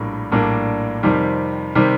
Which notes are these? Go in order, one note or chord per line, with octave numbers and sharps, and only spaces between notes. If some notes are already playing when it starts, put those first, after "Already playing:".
Already playing: A#1 A2 G3 A#3 D4
A#1 A2 G3 A#3 D4
F2 C3 D#3 G3
C3 D#3 G3